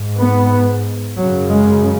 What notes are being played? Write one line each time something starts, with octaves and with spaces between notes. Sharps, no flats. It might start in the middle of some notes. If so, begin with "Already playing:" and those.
Already playing: G#2
B3
F#2 C#3 F#3
G#3